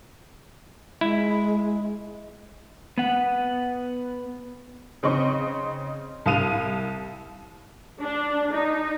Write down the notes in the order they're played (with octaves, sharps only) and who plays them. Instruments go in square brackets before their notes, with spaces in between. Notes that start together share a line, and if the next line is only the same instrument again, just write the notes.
[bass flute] G#3 [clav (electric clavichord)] E4
[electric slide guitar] B3 F#5
[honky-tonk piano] C#3 C4 D#4 D#5 C#6
C2 F5 D#6 D#7 F7
[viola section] D4
D#4